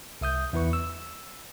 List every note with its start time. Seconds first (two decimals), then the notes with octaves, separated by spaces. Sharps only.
0.21 C2 E5 D#6 G6
0.53 E2 E4 B4 C#6
0.73 E6